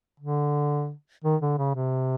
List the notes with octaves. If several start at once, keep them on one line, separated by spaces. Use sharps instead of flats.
D3
D#3
D3
C#3
C3